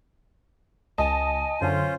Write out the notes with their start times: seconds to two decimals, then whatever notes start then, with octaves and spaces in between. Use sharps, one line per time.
0.98 C#2 D#5 G#5 A5
1.61 F#2 D3 C#4 F4 C5